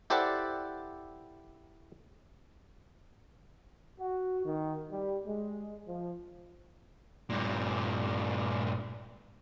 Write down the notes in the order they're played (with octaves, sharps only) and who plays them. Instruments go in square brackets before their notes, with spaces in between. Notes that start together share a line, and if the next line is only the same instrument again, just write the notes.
[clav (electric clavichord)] E4 G4 A4 C5 D5 F#5
[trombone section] F#4
D#3
G3
G#3
F3
[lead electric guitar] G2 A#2